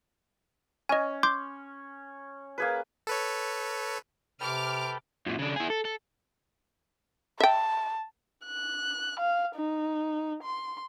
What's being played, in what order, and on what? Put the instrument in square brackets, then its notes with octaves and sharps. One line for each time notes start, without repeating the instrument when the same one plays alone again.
[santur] C#4 [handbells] D#5 G#5
[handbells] C6 D6 G6
[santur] A#3 G#4 B4
[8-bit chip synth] A4 B4 C#5
[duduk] C3 [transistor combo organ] A4 B4 G5 [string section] D6 F6
[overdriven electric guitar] F#2 A#2
C#3 D4
E4 G#4
A4
A4
[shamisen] E5 G5 [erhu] A5
[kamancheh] F#6
F5
D#4
C6